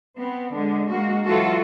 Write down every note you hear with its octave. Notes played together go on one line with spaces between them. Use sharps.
B3 C4
D3 G#3
G#3 A#3 F#4
E3 F#3 F4 F#4 A4